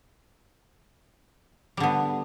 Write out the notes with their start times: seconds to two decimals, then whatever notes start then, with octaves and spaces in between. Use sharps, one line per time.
1.77 G3
1.80 D3
1.83 B3